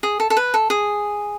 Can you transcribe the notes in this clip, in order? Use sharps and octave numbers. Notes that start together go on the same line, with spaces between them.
G#4
A4
A4
B4
A4
G#4